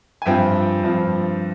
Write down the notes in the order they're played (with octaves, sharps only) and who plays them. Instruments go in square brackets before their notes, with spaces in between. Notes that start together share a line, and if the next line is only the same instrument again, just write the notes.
[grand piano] G#5
G2 F3 C4 F4 E5 G5
G2 F3 C4 F4